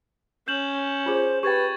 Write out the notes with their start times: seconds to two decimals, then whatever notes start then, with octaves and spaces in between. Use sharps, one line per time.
0.48 C#4 G6 E7 F#7
1.06 F4 G#4 C5
1.43 G4 B4 G5 C#6 G#6 A6